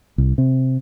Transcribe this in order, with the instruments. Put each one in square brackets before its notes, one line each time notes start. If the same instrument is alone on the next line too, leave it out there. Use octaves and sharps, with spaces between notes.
[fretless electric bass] C2
C3